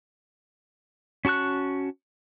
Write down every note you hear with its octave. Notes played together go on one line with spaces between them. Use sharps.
C#4 F#4 A5 C#6 F#6